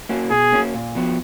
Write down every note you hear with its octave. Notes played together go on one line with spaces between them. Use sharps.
A#3 C#4 F#4
B2 G#4
A#3 C#4 F#4
A#2
F3 B3 F#4